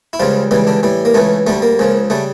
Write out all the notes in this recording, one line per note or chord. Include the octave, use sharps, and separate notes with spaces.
E4
C#2 C#3 F3 G3 F4
C#2 C#3 E3 G3
D3 D4
A2 E3 G3
A#3
C#2 C#3 E3 A3
D2 D3 G3 A3
A#3
C#2 C#3 F3
C#3 G3 A3